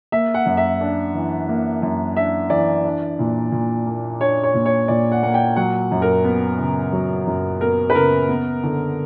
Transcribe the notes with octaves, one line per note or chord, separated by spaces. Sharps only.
A#3 E5
F#5
F#2
E5
D4
E3
A#3
F#2
D4 E5
E3 D5
D4
A#2
A#2
A#3
D4 C#5
C#5
A#2
C#5
A#2 D5
F#5
A#3 F#5
G5
F#3 F#5
F#2
A#4
B3
C#3
F#3
F#2
B3 A#4
B4
C#3 A#4
B3
D3